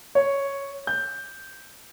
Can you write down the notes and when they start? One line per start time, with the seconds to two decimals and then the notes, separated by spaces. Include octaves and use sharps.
0.15 C#5
0.87 G6